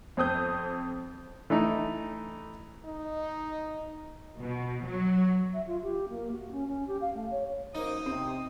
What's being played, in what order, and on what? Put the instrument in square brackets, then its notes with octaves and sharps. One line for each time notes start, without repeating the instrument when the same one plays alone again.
[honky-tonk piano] F2 C4 D#6 G6
[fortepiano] E3 A3 D#4
[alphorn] D#4
[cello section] B2
F#3
[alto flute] E5
F4
G4
A#3
F#4
C#4
C#4
G4
F5
A3
C#5
[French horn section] F#2 A#3 C5 [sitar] D#4 [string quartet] D#6
[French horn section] C3 [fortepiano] C4